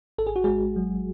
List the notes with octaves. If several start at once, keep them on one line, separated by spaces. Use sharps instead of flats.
G#1 A4
G#4
F#4
G#1 G#3 G#4
F#3